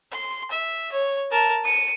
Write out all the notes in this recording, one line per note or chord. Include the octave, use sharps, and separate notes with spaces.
C6
E5
C#5
A#4 A5
C#7 D#7